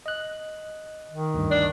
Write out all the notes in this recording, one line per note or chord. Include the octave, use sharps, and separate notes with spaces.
D#5 F#6
D#3
D2 G2
D4